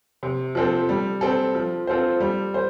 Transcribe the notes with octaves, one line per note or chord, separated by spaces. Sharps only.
C3
F3 C4 A4
G3
C4 A4
F3
C4 F4 A4 C5
G3
C5